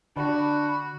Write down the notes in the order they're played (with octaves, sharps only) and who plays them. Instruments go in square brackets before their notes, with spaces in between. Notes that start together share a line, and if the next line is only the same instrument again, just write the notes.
[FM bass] D3 [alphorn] D4 [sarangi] F#4 [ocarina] B5